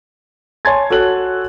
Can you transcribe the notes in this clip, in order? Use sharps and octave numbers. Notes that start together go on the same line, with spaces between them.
C#5 G#5 A5 C6 G#6 A6
F#4 A4 C#5 F#6 F#7